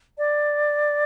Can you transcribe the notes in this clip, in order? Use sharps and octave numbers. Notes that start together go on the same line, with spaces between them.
D5